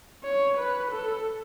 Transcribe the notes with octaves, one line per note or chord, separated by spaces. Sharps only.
C#5
B4
A4